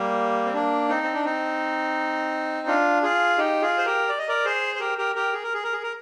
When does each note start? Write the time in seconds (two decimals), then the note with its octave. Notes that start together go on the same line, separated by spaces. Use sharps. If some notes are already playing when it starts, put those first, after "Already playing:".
Already playing: G3 A#3
0.46 C4
0.54 A#3 D4
0.89 C4 D#4
1.03 C4
1.14 D4
1.25 C4 D#4
2.67 D4 F4
3.03 F4 G#4
3.38 D#4 G4
3.62 F4 G#4
3.78 C5
3.86 G4 A#4
4.09 D5
4.19 D#5
4.28 A#4 D5
4.45 G#4 C5
4.76 C5
4.80 G4 A#4
4.98 G4 A#4
5.15 G4 A#4
5.33 G#4
5.43 A#4
5.54 G#4
5.64 A#4
5.73 G#4
5.83 A#4